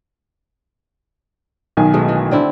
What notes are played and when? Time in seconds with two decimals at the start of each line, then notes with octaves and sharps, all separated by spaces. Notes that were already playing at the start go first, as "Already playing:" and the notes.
1.77 B1 D#3 G#5
1.94 B2 G#3 A3
2.08 E3
2.31 D3 C4 E4